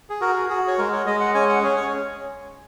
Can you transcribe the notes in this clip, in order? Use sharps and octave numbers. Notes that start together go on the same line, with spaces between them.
G#4
F#4 A#4
G#4
F#4 G#4
C#5
G#3 A#4
C#5
G#3 D#5
F#5
C#4 G#5
F#5
C#4 G#4
C#5